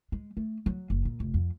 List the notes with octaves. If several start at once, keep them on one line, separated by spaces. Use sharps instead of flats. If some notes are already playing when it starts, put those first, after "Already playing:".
G#3
A3
F#3
F#1
A#2
F1
F2